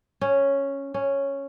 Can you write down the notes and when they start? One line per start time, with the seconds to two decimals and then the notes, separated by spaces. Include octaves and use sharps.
0.21 C#4
0.94 C#4